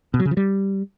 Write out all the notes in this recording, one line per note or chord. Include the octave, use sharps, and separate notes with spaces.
B2
F#3
C#3
F3
G3